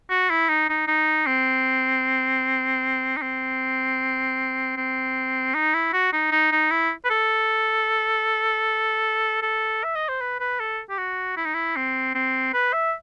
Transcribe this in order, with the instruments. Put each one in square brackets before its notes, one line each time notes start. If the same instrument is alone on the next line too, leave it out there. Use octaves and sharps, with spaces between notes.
[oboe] F#4
E4
D#4
D#4
D#4
C4
D#4
C4
C4
D#4
E4
F#4
D#4
D#4
D#4
E4
B4
A4
A4
E5
D#5
C5
B4
B4
A4
G4
F#4
E4
D#4
E4
C4
C4
B4
E5